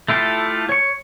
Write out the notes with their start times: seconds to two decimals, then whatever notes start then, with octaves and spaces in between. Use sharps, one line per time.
0.08 A3 E4 F4 G4 A4
0.69 C#5 C#6